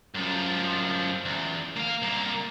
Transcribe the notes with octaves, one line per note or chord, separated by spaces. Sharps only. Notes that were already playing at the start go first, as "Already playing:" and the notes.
F#2 F3
E2
A#3 F5
C2 A#3